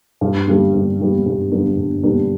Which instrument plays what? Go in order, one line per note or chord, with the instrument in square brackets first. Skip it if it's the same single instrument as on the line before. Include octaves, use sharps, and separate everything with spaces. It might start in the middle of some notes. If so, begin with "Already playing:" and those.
[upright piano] G2
D3 G3 B3 D4
G2
D3 G3 B3 D4
G2
D3 G3 B3 D4
G2
D3 G3 B3 D4